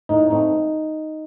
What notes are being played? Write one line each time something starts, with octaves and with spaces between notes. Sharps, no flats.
A2 D#4
A3 C4 D#4